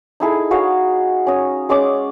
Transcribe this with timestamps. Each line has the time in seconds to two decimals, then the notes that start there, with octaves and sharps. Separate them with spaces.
0.20 D#4 E4 G#4 A4
0.51 F#4 G#4 C#5 F5
1.27 C#4 D#5
1.69 G#3 C#4 D5 D6